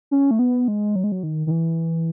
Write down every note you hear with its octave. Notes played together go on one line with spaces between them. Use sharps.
C#4
A3
B3
G#3
F#3
G#3
F#3
D#3
D#3
E3